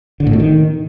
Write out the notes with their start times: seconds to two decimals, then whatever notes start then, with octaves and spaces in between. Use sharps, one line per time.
0.20 D3
0.27 A2
0.33 B2
0.40 D#3